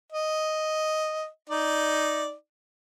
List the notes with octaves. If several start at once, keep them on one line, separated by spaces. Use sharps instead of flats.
D#5
D#4 D5